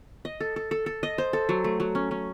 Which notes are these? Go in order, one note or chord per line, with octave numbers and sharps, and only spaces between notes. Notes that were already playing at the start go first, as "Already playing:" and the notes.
D#5
A4
A4
A4
A4
D#5
C5
A4
F#3
A3
F#3
C#4
C#4